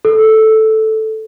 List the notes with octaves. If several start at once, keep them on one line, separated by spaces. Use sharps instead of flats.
A4